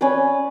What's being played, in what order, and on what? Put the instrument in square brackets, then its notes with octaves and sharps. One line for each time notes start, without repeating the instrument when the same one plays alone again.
[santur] C#4 B4 D5